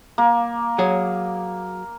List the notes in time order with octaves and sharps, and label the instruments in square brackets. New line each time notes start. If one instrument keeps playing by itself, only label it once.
[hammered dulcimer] A#3
[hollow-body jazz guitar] F#3 G#4